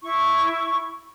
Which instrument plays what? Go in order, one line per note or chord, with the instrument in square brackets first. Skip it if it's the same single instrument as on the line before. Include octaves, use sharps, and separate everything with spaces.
[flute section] E4 C#6